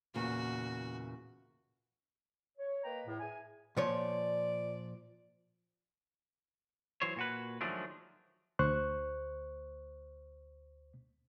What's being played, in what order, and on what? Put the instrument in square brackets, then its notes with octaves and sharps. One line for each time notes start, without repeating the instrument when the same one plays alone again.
[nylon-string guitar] E2 A#2 C#3 [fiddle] F#4
[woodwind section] C#5
A#3 D#4 B4 G5 A#5
E2 A2
G#4 E5 G#5
[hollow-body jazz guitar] A#2 F3 C#5 [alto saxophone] D5
[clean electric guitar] E3 F#3 C5 C#5
A#2 F#4 B4
D#3 F3 F#3 G#3 A3 D4
[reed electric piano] D2 C5 C#6 F#6